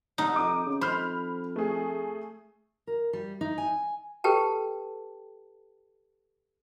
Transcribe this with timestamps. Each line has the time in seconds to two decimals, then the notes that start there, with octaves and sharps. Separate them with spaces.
0.18 C2 D#4
0.36 F2 D6 D#6
0.66 C#3
0.81 F2 C5 B5 F6
1.56 A3 G#4
2.87 A#4
3.13 G3
3.41 D#4
3.58 G#5
4.24 G4 A4 B4 G5 A5